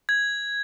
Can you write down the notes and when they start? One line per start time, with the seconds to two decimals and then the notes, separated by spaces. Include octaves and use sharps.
0.09 G#6